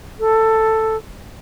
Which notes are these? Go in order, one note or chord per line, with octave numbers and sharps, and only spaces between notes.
A4